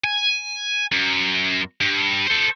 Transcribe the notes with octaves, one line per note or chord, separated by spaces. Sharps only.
G#5
F#2
G2
A4 C5